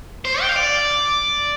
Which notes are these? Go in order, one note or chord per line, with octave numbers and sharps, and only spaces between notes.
C5
G5
F5
D5